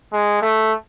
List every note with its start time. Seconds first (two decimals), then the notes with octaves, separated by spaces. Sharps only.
0.13 G#3
0.42 A3